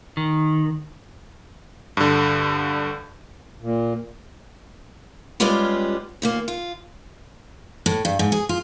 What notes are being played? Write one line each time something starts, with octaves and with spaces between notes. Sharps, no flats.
D#3
G2 D3
A#2
G3 G#3 B3 C#4 F4 G4
D#2 A#2 A#3
F4
A2
G2
G#2
G#4
F4